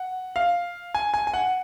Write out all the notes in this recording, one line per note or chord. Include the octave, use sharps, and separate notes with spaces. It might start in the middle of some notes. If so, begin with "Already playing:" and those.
Already playing: F#5
F5
G#5
G#5
G#5
F#5